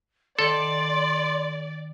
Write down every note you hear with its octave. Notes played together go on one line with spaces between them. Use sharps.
D#3 A4 D5 C6